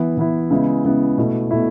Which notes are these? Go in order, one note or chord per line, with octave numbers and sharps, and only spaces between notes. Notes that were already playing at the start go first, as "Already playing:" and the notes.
Already playing: E3 B3 E4
E3 B3 E4
C#3 G#3 B3 E4
C#3 G#3 B3 E4
B2 A3 E4
B2 A3 E4